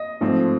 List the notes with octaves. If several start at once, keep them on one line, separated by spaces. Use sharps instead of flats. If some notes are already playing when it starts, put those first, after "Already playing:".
Already playing: D#5
G#2 F3 A3 C4